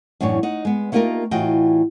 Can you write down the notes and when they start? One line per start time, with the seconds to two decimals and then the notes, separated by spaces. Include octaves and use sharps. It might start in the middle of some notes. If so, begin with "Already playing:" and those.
0.20 F#2 A2 E3 D4 C#5
0.43 D#4 F#5
0.65 G#3 B3
0.92 A3 A#3 D#4 F4 G4 A#4
1.31 A2 E3 F4 F#4 D#5 G5